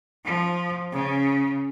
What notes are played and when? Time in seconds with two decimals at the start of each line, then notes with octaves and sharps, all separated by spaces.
0.25 F3
0.92 C#3